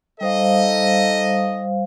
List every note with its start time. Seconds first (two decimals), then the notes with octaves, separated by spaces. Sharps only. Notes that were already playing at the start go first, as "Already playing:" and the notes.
0.21 G3 D#4 A4 C5 D#5 F5